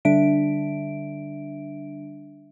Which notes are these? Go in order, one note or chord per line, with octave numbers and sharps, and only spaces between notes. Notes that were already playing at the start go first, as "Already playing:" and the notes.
D3 G3 D4 E5 D7